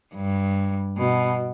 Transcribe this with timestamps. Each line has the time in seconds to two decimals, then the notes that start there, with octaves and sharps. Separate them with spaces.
0.15 G2
0.98 B2